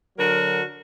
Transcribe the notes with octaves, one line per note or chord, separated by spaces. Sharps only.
D3 F#3 F#4 A#4